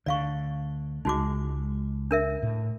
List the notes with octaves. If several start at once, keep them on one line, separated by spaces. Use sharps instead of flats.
D2 D3 D5 F5 C#6
C#2 G#3 D#4 F#4 D6
D4 A#4 E5
A2